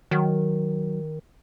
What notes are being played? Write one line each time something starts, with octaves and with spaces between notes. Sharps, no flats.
D#3 F#3